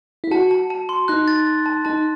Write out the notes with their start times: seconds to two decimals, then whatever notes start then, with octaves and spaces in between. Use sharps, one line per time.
0.24 E4
0.31 F#4 A5
0.51 A5
0.70 A5
0.89 C6
1.08 D#4 F#6
1.28 A6
1.47 A6
1.66 A5
1.85 D#4 A5